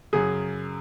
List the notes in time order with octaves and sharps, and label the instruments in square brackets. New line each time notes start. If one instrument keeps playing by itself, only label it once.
[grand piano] F#2 C#3 F#3 [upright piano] G#4